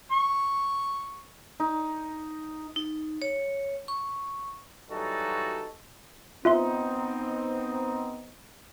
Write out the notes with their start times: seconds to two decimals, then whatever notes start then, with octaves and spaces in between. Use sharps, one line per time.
0.11 C#6
1.60 D#4
2.76 D#4
3.22 C#5
3.88 C#6
4.90 E3 F#3 G3 D#4 F#4 A4
6.45 B3 C4 D#4 F4 E5 C6